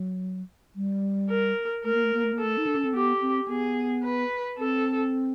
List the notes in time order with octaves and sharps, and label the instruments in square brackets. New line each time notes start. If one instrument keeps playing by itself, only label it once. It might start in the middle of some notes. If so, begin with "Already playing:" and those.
Already playing: [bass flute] F#3
G3
[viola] A#4
[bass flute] A3 [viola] A#4
[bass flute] A#3
A3
A#3
A3
A#3
[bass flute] A3 [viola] A4
[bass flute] D#4
D4
C#4
C4
[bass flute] B3 [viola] G4
[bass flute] C4
[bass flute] B3 [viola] G#4
[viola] B4
[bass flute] C4 [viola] A4